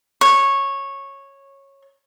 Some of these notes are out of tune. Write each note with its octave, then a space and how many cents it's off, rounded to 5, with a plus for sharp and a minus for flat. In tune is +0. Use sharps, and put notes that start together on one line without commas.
C#5 -10